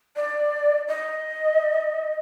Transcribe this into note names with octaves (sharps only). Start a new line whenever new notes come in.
D5
D#5